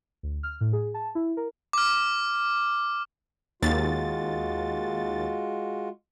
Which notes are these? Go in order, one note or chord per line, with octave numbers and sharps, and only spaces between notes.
D2
F6
A2
G#4
A5
E4
A#4
D6 F6
D#2 G#3 F4 F#4 A6